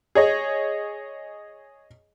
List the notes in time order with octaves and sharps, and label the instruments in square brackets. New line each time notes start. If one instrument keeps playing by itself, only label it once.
[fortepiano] G#4 C#5 D#5